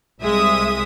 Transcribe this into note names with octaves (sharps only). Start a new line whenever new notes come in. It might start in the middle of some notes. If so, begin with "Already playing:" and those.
C2 G#3 E5 D#6